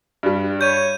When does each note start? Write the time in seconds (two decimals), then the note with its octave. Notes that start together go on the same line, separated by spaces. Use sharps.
0.23 G2 G3
0.61 C#5 G6 D#7